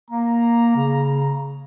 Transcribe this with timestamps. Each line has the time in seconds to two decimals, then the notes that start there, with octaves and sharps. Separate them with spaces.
0.10 A#3 A#5
0.76 C#3